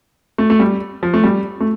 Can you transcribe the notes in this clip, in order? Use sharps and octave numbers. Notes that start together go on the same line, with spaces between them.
A3
A3
G3
F3
A3
G3
A3